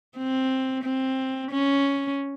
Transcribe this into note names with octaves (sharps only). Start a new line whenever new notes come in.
C4
C4
C#4